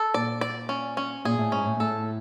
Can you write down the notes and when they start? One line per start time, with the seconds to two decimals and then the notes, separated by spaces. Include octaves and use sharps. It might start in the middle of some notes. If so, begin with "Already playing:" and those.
Already playing: A4
0.14 A#2 D5
0.41 D5
0.69 C#4
0.97 C#4
1.25 A#2 G#4
1.38 A2
1.52 G#2 C#4
1.66 A2
1.80 A2 A4